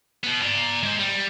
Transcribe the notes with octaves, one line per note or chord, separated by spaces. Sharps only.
B2 B3
D5 A#5
G#3 C5
G3